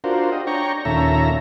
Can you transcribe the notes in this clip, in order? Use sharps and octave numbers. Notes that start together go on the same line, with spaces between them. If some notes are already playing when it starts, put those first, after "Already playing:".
D4 F4 F#4 A#4 C5
G4 D#5
D4 C#5 G5 A#5 C#6
D#2 A#2 C#4 A4 E5 A#5